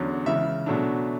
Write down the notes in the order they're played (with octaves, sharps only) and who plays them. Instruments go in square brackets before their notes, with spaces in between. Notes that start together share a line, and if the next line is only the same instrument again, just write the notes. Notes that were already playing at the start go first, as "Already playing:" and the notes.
Already playing: [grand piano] E2 D3 F#3 C#4
C#2 C#3 E3 E5
B2 F#3 A3 D4